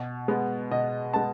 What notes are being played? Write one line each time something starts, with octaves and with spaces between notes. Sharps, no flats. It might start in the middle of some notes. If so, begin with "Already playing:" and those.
Already playing: B2
G#3 B3
B2 D#5
G#3 B3 A5